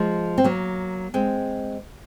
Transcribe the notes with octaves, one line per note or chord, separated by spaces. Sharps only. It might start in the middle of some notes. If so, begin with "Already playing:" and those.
Already playing: F3 G#3
C4
F#3 A#3
G#3 C4